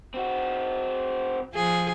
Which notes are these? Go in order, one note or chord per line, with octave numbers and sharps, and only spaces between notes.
C4 F#4
F3 G#4